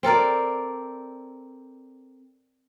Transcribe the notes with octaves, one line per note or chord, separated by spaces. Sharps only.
C4 A4 A#4 D5